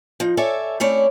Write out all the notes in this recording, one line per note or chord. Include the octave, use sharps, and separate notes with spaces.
F3 D#4
A4 C#5 D5 E5 G#5
A3 C4 C#4 E4 C#5 D5